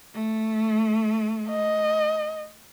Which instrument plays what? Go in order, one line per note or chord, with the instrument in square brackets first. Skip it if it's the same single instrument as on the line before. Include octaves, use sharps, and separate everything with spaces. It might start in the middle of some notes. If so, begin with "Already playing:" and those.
[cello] A3
[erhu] D#5